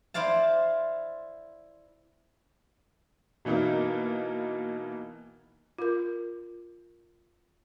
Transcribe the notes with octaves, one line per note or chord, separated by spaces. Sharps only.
E4 C5 D5 F5 A5
B2 E3 A#3 D#4 E4
F4 A#4